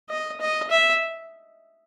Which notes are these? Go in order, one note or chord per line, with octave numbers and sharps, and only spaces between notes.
D#5
D#5
E5